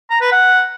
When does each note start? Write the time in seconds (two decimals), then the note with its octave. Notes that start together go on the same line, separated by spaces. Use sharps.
0.10 A#5
0.21 B4
0.32 F#5